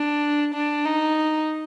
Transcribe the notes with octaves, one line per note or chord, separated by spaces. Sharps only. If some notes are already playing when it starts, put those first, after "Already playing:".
Already playing: D4
D4
D#4